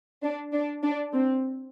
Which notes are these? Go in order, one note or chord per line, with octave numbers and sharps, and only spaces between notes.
D4
D4
D4
C4